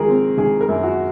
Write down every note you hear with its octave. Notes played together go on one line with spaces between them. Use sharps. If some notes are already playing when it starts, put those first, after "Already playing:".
Already playing: G#1 F3 G#4 A#4
C4
G#1 G#4
A#4
F#2
F#4